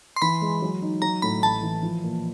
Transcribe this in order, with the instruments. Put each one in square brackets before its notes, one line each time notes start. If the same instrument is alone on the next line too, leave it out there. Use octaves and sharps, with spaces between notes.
[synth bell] C6
[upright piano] E3 [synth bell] B5
[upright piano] G#3
F#3
D#4
[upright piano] F#3 [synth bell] A#5
[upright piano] A2 [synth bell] B5
[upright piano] A1 [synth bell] A5
[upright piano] E3
F3
A#2